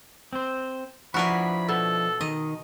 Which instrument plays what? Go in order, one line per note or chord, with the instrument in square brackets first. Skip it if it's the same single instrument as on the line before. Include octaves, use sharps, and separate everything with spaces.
[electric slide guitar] C4 C5
[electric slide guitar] F3 D4 E4 [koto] F#4 A#4 B4 [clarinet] B5
[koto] B2 [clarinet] A4
[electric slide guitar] D#3 [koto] D#5